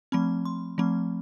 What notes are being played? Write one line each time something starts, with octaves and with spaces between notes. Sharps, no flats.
F3 A3 C4 B5
C6
F3 A3 C4 B5